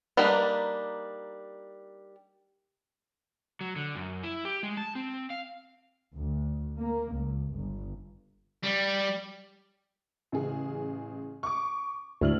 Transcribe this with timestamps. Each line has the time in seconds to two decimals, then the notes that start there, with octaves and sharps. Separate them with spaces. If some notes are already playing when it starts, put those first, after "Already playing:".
0.17 G3 A#3 D4 D#4 B4
3.61 F#3
3.76 D3
3.95 F#2
4.23 E4
4.45 G4
4.63 G#3
4.77 A5
4.95 C4
5.30 F5
6.17 D2
6.80 A#3
7.16 C#2
7.54 G1
8.63 G3
10.32 A1 C#3 G#4
11.43 C#6 D6
12.21 D2 A2 F6 F#7